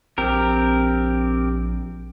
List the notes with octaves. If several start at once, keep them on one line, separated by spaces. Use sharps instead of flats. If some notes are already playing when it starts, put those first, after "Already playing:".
A#1 C4 G4 A#4